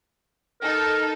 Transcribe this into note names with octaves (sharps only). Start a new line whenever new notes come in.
D#4 A4 A#4 A5